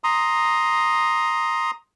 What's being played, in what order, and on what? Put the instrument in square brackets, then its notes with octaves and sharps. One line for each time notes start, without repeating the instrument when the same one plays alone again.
[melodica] A#5 C6 D#6